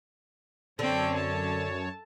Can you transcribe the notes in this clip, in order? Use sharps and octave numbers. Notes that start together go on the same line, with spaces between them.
F#2 D3 C4 C#5 G5
A5